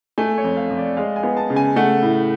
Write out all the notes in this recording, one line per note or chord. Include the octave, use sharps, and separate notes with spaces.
A3 G#5
C#5
F2
F5
F2
D5
G#3 F5
G#5
B3
A5
C#3
G#5
A3 F#5
A2